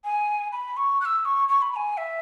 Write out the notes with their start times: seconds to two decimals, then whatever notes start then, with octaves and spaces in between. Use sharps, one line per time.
0.04 G#5
0.52 B5
0.77 C#6
1.01 F#6
1.05 E6
1.25 C#6
1.48 C#6
1.62 B5
1.72 B5
1.76 G#5
1.97 E5